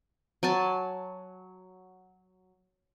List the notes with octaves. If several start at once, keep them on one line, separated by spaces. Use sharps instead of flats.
F#3 G#5 A5